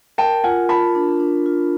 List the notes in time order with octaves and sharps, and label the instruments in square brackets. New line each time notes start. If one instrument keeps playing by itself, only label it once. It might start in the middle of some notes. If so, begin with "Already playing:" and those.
[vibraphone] A#4 [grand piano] G5 A5
[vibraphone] F4 [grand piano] F#5 G#5
[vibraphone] F4 [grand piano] A5 B5
[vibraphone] D4
D4
F4